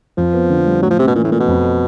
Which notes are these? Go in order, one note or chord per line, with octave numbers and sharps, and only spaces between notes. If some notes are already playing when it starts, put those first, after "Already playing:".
F2 F3
B3
D3
G3
A2 F#3
F3
C3 C#4
B2
A#2 E3
A2
A#2 A3
B2
F2